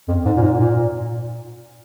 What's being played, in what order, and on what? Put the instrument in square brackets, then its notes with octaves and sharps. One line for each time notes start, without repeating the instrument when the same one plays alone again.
[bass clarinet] F2
G#2
A#2
G#2
A#2